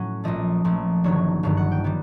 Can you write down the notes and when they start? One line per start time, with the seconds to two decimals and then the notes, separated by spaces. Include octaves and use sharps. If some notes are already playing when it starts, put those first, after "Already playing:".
Already playing: A2 F#3 C#4 F#5
0.24 A#1 A#2 F3 A3 D#5
0.64 A#1 A#2 F3 A3
1.04 G1 G2 D#3 F#3 C#5
1.43 G1 G2 D#3 F#3 F5
1.57 F#5
1.71 G5
1.84 D#3 G3 B3